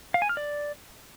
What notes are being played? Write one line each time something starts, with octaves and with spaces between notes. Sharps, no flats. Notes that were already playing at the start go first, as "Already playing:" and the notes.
F5
G#5
F6
D5